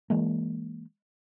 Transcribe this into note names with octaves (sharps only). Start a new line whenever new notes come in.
E3 G#3 A#3